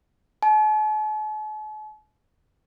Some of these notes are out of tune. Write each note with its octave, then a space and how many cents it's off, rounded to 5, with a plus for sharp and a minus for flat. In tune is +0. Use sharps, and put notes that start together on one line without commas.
A5 -45